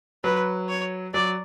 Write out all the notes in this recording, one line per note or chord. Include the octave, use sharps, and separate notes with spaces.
F#3 B4
C#5
F#3 D5